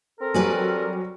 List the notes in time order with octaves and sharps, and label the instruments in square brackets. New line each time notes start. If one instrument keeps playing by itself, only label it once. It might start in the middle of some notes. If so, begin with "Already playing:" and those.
[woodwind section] C4 A4 A#4
[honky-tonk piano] F#3 G3 [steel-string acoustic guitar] B4 D5 G#5